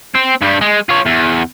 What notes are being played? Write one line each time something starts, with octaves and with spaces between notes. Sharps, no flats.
C4
G2 G3
G#3
F4 C#5
E2